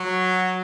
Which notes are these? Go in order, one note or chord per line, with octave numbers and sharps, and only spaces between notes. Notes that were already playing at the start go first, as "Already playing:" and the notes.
Already playing: F#3